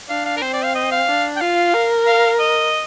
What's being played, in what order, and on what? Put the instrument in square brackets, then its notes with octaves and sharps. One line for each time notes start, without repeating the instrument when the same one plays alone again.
[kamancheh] D4 [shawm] F5
[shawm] F5
A#4
[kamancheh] C4 [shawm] C5
[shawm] D5
F5
D#5
F5
[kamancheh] D4
[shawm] G5
[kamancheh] F4 [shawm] F5
[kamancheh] A#4
[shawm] F5
D#5